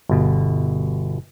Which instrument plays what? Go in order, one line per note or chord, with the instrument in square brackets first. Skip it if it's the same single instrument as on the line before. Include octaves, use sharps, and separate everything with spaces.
[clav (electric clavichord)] G1 B2